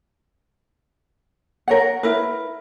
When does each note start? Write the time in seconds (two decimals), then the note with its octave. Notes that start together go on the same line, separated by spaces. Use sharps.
1.68 A#4 C#5 F#5
2.03 E4 A#4 B4